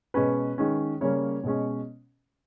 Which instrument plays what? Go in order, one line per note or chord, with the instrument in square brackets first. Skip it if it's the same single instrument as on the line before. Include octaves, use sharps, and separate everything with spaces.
[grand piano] B2 G#3 C#4 B4
D#3 G#3 C#4
C#3 G3 A#3 C#4 C#5
B2 G#3 C#4